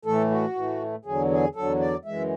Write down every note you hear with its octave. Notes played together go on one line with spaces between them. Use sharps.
A2 E3 A3 A4
F#4
A2 E3 A3
E2 D3 F#3 G#4
G#4
E2 D3 F#3 A4
D5
F#2 E3 G#3 E5